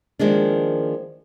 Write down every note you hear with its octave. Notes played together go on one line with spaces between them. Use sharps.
D#3 F3 G#3 A#3 D4